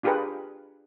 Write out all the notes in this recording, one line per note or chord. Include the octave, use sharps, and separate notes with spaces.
D4 F4 G4 G#4 A#4 B4